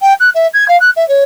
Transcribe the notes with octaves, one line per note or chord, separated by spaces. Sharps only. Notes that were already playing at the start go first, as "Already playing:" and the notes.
G5
F#6
E5
G#6
F5
F#6
E5
C#5